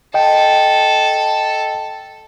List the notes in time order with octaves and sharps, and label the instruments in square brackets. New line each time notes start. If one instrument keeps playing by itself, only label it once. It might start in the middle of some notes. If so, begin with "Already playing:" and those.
[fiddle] A4 [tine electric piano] D#5 G5